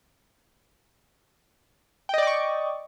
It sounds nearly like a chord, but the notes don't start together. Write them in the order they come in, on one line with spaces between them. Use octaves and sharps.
G5 D#5 D5 D6 C#6